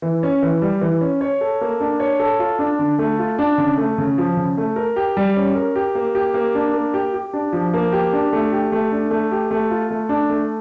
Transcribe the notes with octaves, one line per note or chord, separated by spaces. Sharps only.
E3
C#4
E3
G3
E3
C#4
C#5
A4
A#3
D4
C#5
A4
F4
D4
D3
A3
F4
D4
C#3
A3
C#3
F3
C#3
A3
A#4
G4
G3
C#4
A#4
G4
A#3
G4
A#3
D4
A#3
G4
G4
D4
F3
A#3
G4
D4
A3
G4
A3
D4
A3
G4
A3
F4
A3
D4
A3